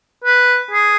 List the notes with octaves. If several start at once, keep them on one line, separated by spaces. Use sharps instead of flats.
B4
G#4